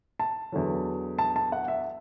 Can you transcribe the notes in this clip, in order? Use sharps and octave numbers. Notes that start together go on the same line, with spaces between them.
A5
E2 D3 F#3
A5
A5
F#5
E5